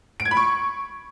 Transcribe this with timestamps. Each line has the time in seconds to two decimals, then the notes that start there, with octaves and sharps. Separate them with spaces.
0.20 D7
0.25 G#6
0.31 B5
0.37 C#6